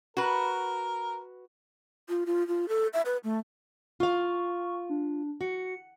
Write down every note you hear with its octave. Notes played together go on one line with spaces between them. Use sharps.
F#4 A#4 B4
F4
F4
F4
A4
E5
B4
A3
F4 F5 C#6
D4
F#4 C#7